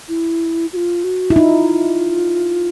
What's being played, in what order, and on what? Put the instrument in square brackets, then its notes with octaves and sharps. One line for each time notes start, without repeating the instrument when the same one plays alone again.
[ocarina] E4
F#4
F4
F#4
[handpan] E4
[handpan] D#4 [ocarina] F4